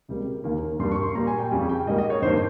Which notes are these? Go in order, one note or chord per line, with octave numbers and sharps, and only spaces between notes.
C#2 C3 G3 A#3
D#2 D#3 A#3
G2 G3 A#3 C6
C#6
C6
A#2 G3 A#3 A#5
G#5
G5
F2 C#3 G3 G#5
G5
G#2 G3 A#3 D#5
D#5
C#5
G2 D#3 A#3 C5